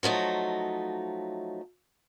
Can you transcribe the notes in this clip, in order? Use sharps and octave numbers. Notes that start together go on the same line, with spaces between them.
F3 F#3 A3 D#4